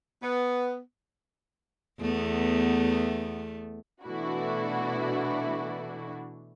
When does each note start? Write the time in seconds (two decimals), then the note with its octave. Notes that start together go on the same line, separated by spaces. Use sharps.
0.22 B3
1.99 E2 A3 B3
4.03 B2 E3 A3 D4 E4 F#4